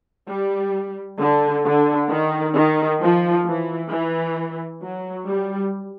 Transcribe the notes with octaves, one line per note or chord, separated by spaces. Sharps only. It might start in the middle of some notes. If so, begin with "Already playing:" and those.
G3
D3
D3
D#3
D#3
F3
E3
E3
F#3
G3